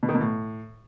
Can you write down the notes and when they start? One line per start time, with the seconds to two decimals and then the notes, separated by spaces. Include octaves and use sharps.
0.03 B2
0.09 D#3
0.15 B2
0.21 A2